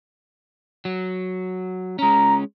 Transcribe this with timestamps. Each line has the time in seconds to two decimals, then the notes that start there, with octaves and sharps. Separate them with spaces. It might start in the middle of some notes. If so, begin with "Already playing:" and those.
0.85 F#3
1.99 G#3 C#4 A#5